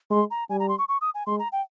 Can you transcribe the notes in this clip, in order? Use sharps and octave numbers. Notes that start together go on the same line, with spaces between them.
G#3 C6
A#5
G3 G#5
A#5
C6
C#6
C#6
D#6
G#5
G#3 C6
A#5
G5